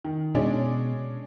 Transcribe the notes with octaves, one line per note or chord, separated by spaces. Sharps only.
D#3
B2 G#3 C#4 D4